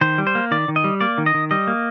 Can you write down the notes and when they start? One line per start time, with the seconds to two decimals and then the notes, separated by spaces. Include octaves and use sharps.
0.01 D#3 C5
0.18 G3
0.27 C5
0.35 A#3
0.51 D#3 D5
0.68 D#3
0.76 D#5
0.84 G3
1.01 A#3 D5
1.18 D#3
1.26 D#5
1.34 D#3
1.51 G3 D#5
1.67 A#3